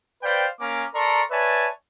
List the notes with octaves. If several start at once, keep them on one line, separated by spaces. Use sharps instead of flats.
B4 C5 D5 F5 G5
A#3 C#4 F5 G#5 A#5 D6
A4 A#4 D5 A#5 C6 C#6
B4 C#5 D5 E5 G#5 A5